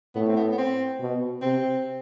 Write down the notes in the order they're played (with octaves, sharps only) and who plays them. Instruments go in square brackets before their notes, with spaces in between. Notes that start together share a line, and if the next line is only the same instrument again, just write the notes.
[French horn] A2 [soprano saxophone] B3
[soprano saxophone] C4
B3
B3
C4
[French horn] B2
[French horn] C3 [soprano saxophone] C4